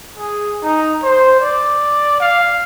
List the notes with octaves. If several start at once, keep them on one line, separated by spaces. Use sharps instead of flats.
G#4
D#4
C5
D5
F5